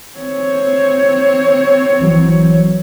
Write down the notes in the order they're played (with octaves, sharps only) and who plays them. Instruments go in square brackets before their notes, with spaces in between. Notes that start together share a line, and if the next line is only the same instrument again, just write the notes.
[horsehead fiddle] C4 C#5
[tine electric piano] G1 E3 F#3